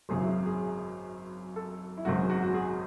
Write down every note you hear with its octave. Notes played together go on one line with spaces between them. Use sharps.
G#1 F#2 C#3 F#3 G#4
E4
G#4
A4
E4
G#1 F#2 C#3 F#3 F#4
F#4
F#4
G#4